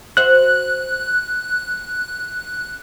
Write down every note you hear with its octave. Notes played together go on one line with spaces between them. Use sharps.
F#4 C5 E5 F#6